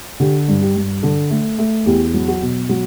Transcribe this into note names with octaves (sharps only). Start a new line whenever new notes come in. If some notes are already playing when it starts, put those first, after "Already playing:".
D3 G4
G2
G4
G2
D3 A4
A3
A3
E2 G4
F#3
F#4
B2
F#3 F#4